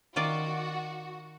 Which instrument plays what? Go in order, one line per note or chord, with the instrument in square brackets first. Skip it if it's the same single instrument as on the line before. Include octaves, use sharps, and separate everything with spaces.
[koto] D#3 F4 D5 [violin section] F#4